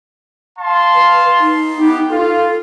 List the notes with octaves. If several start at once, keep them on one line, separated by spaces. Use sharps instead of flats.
F5 A5 C6
B4
D#4
B3 G4
F4 A4